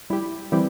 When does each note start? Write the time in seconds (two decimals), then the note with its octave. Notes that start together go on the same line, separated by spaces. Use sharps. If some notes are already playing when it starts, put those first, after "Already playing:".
0.10 G3 E4 G4
0.52 E3 G3 C4 E4 G4